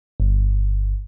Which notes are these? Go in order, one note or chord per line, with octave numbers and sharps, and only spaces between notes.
G1